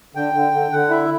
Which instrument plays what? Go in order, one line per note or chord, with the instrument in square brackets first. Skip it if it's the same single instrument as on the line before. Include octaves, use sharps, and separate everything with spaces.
[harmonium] D3 G5
D3
D3
D3 F#5
E4 E5